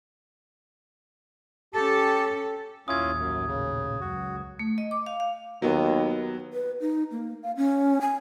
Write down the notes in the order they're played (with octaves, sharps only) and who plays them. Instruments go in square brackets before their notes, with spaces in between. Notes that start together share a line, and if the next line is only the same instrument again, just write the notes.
[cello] C#4 A4 [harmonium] G4 A5
[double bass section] A1 D#2 A#2 [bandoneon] C#4 E4 F4 [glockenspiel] D#6 G#6
[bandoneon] F#2
C#3
[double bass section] C#2 F#2 F#3 [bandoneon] F#4
[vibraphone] A3
D#5
D6
F5
F5
[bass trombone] D#2 [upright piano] F#3 B3
[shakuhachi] B4
D#4
A#3
F5
C#4
G#5